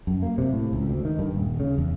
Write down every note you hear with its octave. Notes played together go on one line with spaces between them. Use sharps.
F#2
A#3
C3
A2
C#2
D2
D#3
G2
D#1
C#3
E2